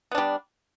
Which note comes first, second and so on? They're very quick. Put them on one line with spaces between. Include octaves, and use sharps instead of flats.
B3 D4 G3